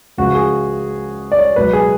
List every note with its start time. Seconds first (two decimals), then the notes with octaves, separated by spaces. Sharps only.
0.18 C#2 C#3 F3 F#4
0.35 G#4
1.32 D5
1.39 C#5
1.56 C#2 B2 F#3 B4
1.73 G#4